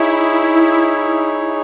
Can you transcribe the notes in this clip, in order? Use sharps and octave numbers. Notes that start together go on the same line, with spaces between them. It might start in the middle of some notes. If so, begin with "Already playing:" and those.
Already playing: D#4 E4 G#4 C#5